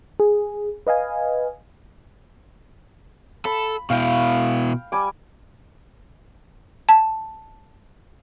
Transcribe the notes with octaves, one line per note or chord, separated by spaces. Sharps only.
G#4
B4 D#5 F5 G#5
A4 B5
B2 E4 F5 G5
G3 G#5 D6
A5